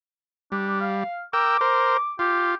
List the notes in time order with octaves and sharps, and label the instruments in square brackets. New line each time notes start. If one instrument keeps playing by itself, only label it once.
[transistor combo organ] G3 [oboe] D4
[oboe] F5
[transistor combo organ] A#4 G5 E6 [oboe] D6
[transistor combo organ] A#4 C5
[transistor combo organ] F4 [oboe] G4